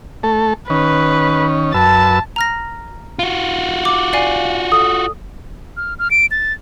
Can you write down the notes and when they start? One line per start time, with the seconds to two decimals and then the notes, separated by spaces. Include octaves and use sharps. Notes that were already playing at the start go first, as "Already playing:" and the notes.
0.23 A3 A4
0.70 D#3 C#4 B4
1.74 F#2 B4 A5 E6
2.36 A#5 F6 A#6
3.19 F4 F#4
3.85 D6
4.13 D5 F5 G#5
4.72 A4 D#6
5.77 F6
5.99 F6
6.11 D7
6.31 A6